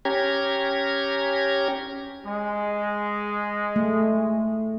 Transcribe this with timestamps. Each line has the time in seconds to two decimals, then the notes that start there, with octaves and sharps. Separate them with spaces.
0.05 C#4 G4 A#5 G#6
2.24 G#3
3.76 A3